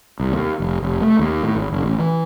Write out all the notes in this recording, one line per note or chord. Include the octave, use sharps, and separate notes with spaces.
C2
D#2
F1
F1
A3
D#2
A2
G#1
F#1
A1
E3